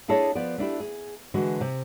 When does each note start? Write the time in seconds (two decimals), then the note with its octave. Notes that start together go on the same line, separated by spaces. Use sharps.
0.08 D4 E4 G#4 A4 C#5 D#5
0.35 F3 B3 D5
0.58 A3 D4 E4 G4
0.80 G#4
1.34 D3 E3 G#3 F#4
1.61 C3